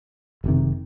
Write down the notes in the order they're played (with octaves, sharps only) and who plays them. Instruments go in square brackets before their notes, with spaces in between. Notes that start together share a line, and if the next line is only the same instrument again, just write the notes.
[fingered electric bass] F#1 E2 C3 D#3